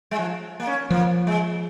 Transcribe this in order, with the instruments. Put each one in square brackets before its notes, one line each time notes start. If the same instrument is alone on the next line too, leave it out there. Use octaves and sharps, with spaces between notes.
[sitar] G#3
F3
A#3
C#4
[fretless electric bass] F3 [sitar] A#3
[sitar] G#3